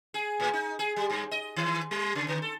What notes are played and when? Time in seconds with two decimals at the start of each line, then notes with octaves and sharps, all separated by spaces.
0.14 G#4
0.40 A2
0.53 D#4
0.79 G#4
0.96 G3
1.10 G2
1.31 D#5
1.56 D#3
1.91 G3
2.15 C#3
2.28 D3
2.42 A4